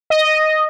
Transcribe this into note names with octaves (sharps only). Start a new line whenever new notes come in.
D#5